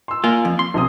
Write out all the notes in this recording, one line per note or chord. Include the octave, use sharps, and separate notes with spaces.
C6 E6
A#3 F4 G#5
F2
C6
A#1 C3 D#6